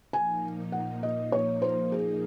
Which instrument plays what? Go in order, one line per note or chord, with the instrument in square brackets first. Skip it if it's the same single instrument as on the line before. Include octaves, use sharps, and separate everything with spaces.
[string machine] A#2 F3 A#3 D#4 [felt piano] G#5
[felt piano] F#5
D#5
C#5
C5
G#4